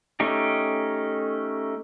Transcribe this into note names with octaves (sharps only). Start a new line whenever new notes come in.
A3 C#4 D#4 G4